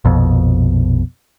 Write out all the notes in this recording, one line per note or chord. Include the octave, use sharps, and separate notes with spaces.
A#1 F2 B2